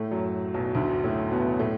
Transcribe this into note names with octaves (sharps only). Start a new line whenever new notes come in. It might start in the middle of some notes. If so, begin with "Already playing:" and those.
Already playing: A2 A3
F#2 F#3
B1 B2
D2 D3
A2 A3
B2 B3
A2 A3